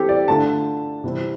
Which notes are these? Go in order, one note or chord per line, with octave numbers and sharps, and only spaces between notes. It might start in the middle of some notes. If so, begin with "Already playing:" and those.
Already playing: E3 C4 G4 A4
D5
D3 A3 D4 F4 A5
C3 E3 G3 C4